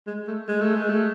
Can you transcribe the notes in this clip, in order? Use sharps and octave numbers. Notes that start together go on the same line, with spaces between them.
G#3
A3
G#3
A3
G#3
A3